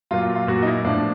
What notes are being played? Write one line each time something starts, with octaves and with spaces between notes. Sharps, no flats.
A#2 F#3 F4
F4
F4
A#2 F#3 F#4
D#4
E4
A2 F3 D4